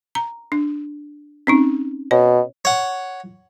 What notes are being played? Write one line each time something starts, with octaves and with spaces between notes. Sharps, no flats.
A#5
D4
C4 C#4 D#4
B2 C#5
C#5 F#5